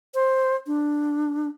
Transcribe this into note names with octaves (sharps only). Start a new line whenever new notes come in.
C5
D4